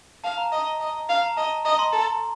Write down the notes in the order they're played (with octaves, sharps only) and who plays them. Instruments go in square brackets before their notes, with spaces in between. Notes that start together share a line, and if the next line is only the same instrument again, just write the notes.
[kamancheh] F5 [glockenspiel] A5
[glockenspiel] A#5
[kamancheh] D#5
D#5
F5
[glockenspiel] A#5
[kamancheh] D#5 [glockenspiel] A5
[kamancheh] D#5 [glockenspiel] A#5
[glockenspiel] C6
[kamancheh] A4